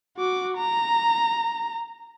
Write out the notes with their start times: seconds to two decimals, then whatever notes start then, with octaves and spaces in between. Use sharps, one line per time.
0.18 F#4 D6
0.57 A#5